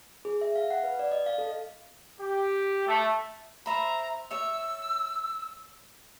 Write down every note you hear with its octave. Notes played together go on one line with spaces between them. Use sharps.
G#4
E5
F5
F#5
B4
D5
D#5
F5
A4
G4
A3
C5 E5 A#5 B5
C#5 E5 E6